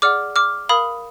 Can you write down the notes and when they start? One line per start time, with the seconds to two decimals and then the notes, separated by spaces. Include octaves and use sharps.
0.02 G#4 D5 F#5 D6 F6
0.36 D6 F6
0.69 A#4 F5 B5 D#6